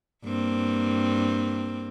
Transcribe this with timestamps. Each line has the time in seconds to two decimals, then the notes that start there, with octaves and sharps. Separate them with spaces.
0.25 G2 A#3 C4